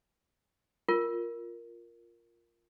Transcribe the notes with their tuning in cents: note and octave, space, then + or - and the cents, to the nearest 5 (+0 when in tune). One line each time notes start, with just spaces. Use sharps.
F4 +0 A#4 +0